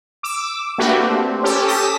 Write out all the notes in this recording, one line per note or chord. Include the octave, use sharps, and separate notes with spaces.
D6 E6
A3 A#3 D4 F#4 G4 B4
C4
C#4 G4 A4
A5 D#6 A#6 B6